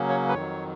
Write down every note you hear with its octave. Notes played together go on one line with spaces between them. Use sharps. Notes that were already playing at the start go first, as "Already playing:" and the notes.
Already playing: C#3 F#3 A#3 C#4
C#5
B4
F2 D#3 F#3 C#5